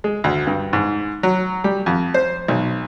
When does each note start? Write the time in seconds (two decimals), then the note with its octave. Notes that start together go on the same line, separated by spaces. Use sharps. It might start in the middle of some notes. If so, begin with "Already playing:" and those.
0.04 G#3
0.24 D2
0.47 G2
0.73 G#2
1.23 F#3
1.64 G3
1.86 F2
2.14 C5
2.48 B1